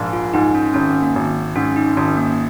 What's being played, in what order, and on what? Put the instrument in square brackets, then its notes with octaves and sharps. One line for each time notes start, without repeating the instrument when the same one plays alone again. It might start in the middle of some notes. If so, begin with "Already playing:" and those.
Already playing: [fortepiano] A#1 G#2
[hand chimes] F4
[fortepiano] G#2 [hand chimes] D#4
[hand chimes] C#4
[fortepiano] G#1 [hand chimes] C#4
[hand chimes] A#3
[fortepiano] G#1
[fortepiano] G#2 [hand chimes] C#4
[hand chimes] D#4
[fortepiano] G#1 [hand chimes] C#4
[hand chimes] A#3